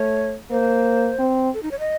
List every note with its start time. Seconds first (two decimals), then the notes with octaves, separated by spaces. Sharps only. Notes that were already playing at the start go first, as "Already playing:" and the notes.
Already playing: A3 C#5
0.51 A#3 C5
1.19 C4
1.54 A4
1.63 D#4
1.71 C#5
1.79 D#5